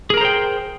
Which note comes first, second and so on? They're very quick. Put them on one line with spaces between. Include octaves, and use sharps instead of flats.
G#4 A#4 A#5 C5 G5